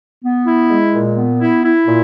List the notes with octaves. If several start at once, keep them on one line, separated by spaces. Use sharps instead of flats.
B3
E4
G#3
A#2
B3
E4
E4
A#2